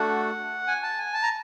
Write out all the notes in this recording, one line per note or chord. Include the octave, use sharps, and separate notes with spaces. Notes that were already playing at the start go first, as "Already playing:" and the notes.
Already playing: A3 D4 F#4 A4 F#5
G#5
A5
G#5
A5
A#5